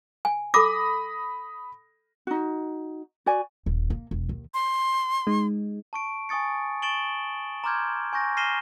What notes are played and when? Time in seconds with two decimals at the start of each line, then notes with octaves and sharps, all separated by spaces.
0.25 G#5
0.54 A4 B5 D6 D#6 A#6
2.27 D#4 F#4
3.26 F#4 D5 G#5
3.66 D#1
3.90 A#3
4.11 E1
4.29 D#2
4.54 C6
5.27 G#3 D#4
5.93 A5 C#6 D7
6.29 G#5 C#6 D#6 A6 C#7
6.82 C#6 A6 D7 E7 F#7 G7
7.64 A#5 C6 D6 F6 G6 G#6
8.13 G#5 C#6 G6 A#6
8.37 F6 A#6 C7 D#7 E7 G7